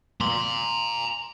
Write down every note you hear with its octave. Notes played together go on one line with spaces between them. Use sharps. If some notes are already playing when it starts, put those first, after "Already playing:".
A#5 C6